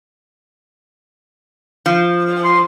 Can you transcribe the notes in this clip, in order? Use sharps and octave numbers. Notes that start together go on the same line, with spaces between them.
F3
C6